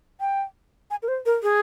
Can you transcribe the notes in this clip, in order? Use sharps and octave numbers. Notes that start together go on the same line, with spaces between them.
G5
G#5
A#4
C5
A#4
G#4